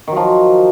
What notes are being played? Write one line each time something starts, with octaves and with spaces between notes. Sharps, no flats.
D#3 F3 F#3